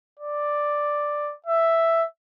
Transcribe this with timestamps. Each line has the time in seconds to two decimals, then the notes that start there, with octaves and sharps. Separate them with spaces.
0.19 D5
1.46 E5